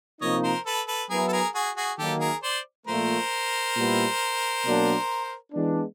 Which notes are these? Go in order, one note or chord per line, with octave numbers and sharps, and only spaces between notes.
C3 F3 A#3 D#4 C#5 D#5
A#4 C5
A4 B4
A4 B4
F#3 B3 E4 G#4 A#4
A4
G#4 A#4
F#4 G#4
F#4 G#4
D#3 F#3 A#3 G4 A4
G#4 A#4
C5 D5
A#2 F3 A3 A#4 C5
A#2 G3 B3 E4
B2 F#3 A#3 D4
E3 G#3 B3 D4